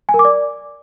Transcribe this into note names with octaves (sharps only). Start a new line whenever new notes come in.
G#5
A#4
D6
D5